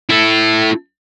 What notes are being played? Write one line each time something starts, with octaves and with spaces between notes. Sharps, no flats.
E4 A4